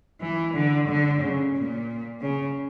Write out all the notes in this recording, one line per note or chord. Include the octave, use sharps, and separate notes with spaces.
E3
D3
D3
C#3
A#2
C#3